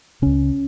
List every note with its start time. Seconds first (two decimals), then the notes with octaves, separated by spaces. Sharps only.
0.22 C#2 C#3 C#4